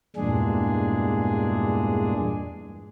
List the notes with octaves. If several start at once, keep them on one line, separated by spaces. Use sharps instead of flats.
E2 G2 A#2 G#3 D4 G#4